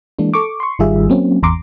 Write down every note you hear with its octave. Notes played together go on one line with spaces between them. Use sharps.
E3 G#3 A#3 D4
A4 C#6 D6
C6 C#6
G#1 D#3 G3 F4 G#4 E5
F#3 A#3 C4 C#4
G#1 E2 A#5 C6 D6